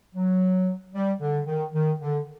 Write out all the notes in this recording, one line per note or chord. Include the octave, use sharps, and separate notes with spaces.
F#3
G3
D3
D#3
D#3
D3